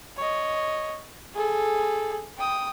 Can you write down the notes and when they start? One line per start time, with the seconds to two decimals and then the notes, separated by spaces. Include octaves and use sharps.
0.17 C#5 D#5
1.34 G#4 A4
2.38 G5 D#6